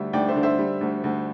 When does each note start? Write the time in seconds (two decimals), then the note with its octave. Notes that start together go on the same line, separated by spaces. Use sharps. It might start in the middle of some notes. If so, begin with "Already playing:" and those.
Already playing: D2 D3 G3 E5
0.13 D2 D5 G5
0.28 C5 E5
0.36 D3
0.43 C5 E5
0.59 G3
0.81 D2
1.04 D2